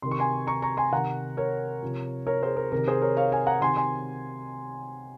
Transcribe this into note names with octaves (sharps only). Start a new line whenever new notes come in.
C3 D#3 C6
C#6
G#5 C6
A#5 C#6
A#5 C#6
G#5 C6
C3 D#3 F#5 A#5
A#4 C#5
C3 F3
A#4 C#5
G#4 C5
A#4
C3 D#3 A#4
G#4 C5
A#4 C#5
C#5 F5
F5 G#5
F#5 A#5
C3 D#3 G#5 C6
G#5 C6